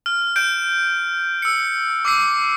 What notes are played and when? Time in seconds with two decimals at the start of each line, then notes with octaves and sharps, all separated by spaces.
0.06 F6
0.36 G6 D7
1.42 E6 C#7
2.05 D6 E6 C7